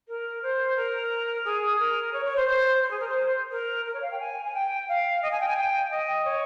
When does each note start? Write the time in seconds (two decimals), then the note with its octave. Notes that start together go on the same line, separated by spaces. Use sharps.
0.08 A#4
0.42 C5
0.76 A#4
1.45 G#4
1.79 A#4
2.13 C#5
2.25 C#5
2.36 C5
2.48 C5
2.82 C5
2.91 G#4
3.00 A#4
3.08 C5
3.51 A#4
3.85 A#4
3.93 C#5
4.02 F5
4.11 G5
4.20 G#5
4.45 G#5
4.54 G5
4.88 F5
5.22 D#5
5.31 G#5
5.40 G5
5.48 G#5
5.56 G5
5.91 D#5
6.25 C#5